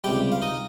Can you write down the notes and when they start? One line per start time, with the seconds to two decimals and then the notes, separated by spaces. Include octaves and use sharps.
0.04 C#2 C3 G3 G4 G5
0.32 F5
0.42 D#4 D#5